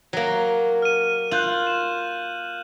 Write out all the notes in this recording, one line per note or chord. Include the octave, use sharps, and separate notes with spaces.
F#3 A#3
F6 D#7
F4 F#6 G6 F#7
E7